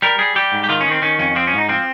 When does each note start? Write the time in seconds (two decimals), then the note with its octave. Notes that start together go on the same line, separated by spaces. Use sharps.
0.02 G3 A#4
0.19 G3 G#4
0.35 G3 G4
0.52 G#2
0.64 G4
0.69 D#3 F4
0.81 C#4
0.86 D#3
0.91 C4
1.02 D#3 C#4
1.19 F2 C#4
1.36 F3 C4
1.47 C#4
1.53 G#2
1.58 D#4
1.69 F3 C4